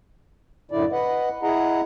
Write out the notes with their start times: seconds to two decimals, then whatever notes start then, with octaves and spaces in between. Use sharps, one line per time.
0.71 F#2 A2 D3 E4 D5
0.92 B4 D#5 F#5
1.43 E4 G#4 D#5 F#5 A#5